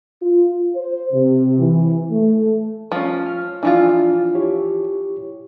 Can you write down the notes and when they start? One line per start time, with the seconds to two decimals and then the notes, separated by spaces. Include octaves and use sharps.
0.22 F4
0.75 C5
1.12 C3
1.59 E3
2.11 A3
2.92 F3 C#4
3.26 F6
3.63 E3 F3 D4 E4 F4 D5
4.35 E4 G4 C#5